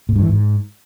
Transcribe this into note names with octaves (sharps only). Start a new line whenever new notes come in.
A2
G2
E3
G#2